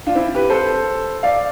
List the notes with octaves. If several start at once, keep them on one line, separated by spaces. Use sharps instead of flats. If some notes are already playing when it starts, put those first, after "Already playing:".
D4 F4
C4 E4
G4 B4
A4 C5
D5 F5